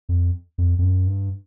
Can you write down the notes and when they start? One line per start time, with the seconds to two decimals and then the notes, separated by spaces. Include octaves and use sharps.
0.09 F2
0.58 F2
0.78 F2
0.82 F#2
1.07 G2